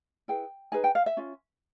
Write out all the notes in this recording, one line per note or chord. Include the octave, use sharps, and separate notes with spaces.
E4 G#4 B4 G5
D#4 G#4 B4 G#5
G5
F5
E5
C#4 F4